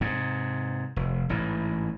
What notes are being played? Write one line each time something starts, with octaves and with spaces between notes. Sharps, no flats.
G#2 C3
F1
A1 G#2 E3